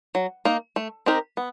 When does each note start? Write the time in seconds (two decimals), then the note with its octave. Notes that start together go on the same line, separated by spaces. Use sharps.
0.15 F#3
0.45 A#3 D#4
0.76 A3
1.06 C4 D#4 G4 A#4
1.37 B3